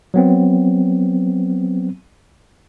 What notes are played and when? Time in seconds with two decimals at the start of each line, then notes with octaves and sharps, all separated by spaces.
0.14 F#3 B3 C4